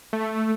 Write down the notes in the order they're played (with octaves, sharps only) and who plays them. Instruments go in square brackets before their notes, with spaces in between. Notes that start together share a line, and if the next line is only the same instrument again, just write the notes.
[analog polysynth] A3